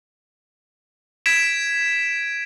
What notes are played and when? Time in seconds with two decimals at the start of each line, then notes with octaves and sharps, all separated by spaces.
1.26 G#6 B6 D7 E7